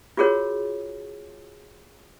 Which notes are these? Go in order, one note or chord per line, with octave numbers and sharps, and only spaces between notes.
F4 F#4 G#4 A#4 C#5